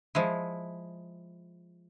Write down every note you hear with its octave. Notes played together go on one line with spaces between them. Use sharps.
F3 G#3 E4